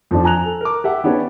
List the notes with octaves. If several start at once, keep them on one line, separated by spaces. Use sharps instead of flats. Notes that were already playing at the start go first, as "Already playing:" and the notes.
F2 F3 D4
G#5 A#5 F#6 F7
A4
A#4 D6
G4 E5 F#5
B3 C#4 D4 G4 B4 C#5